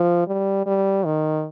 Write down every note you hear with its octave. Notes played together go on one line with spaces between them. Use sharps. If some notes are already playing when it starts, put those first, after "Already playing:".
Already playing: F3
G3
G3
D#3